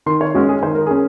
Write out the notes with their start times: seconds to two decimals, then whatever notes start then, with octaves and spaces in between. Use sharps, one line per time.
0.06 D#3 C6
0.21 C#5
0.34 G#3 C#4 F#4
0.49 G#4
0.63 D#3 C5
0.75 A#4
0.87 C#4 G#4